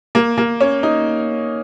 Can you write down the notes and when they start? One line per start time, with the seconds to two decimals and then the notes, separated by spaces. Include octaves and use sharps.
0.15 A#3
0.38 A#3
0.60 C#4
0.83 D#4